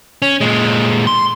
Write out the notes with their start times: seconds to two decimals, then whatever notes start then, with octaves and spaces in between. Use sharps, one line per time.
0.22 C#4
0.41 A#2 G#3
1.07 C6